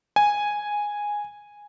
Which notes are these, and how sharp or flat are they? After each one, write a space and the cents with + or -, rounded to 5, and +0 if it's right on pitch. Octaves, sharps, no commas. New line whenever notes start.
G#5 -5